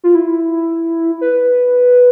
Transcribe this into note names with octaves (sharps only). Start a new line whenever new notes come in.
F4
E4
B4